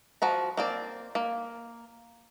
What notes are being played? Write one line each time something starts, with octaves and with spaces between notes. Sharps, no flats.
F3 F#4 A#5
A#3 C4 D5
A#3